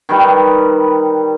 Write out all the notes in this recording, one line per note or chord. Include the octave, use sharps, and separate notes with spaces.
D#3 G3 B4